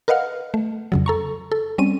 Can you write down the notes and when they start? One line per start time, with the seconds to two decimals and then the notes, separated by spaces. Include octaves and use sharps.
0.08 A#4 B4 D#5 F5 F#5 F6
0.54 A3
0.92 F2 C#3 F#3
1.06 A4 A#5 C#6
1.52 A4
1.78 G3 C4 C#4 D#7